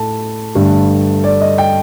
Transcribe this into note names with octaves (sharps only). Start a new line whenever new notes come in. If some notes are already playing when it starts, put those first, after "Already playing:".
Already playing: A2 A3 A5
G2 D3 A3
D5
D#5
G5